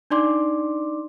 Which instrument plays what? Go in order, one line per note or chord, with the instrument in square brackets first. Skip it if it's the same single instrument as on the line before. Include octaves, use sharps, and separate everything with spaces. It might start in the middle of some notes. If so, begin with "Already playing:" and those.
[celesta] D4 D#4 D5 C6 D6